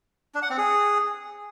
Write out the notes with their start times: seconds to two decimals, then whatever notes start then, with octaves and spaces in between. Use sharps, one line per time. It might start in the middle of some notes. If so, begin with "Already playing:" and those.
0.35 D4
0.42 F#5
0.50 C4
0.58 G#4